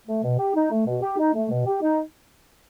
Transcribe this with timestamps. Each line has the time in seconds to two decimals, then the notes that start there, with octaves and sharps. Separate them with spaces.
0.07 A3
0.24 B2
0.39 G4
0.55 D#4
0.72 A3
0.86 B2
1.02 G4
1.19 D#4
1.35 A3
1.51 B2
1.66 G4
1.82 D#4